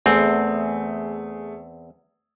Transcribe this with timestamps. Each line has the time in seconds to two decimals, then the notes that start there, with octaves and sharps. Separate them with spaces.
0.06 E2 A3 C4 G#4